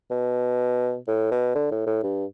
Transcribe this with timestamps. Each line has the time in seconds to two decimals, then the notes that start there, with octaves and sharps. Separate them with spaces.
0.11 B2
1.08 A2
1.31 B2
1.55 D3
1.71 A2
1.87 A2
2.03 G2